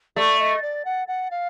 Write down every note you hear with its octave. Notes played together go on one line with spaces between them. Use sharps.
A3 D5
D#5
D5
F#5
F#5
F5